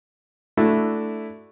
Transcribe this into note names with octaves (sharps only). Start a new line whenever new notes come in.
A3 D4 E4 F#4